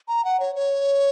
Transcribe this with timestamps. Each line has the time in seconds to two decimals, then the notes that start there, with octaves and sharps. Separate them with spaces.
0.08 A#5
0.25 F#5
0.40 C#5
0.55 C#5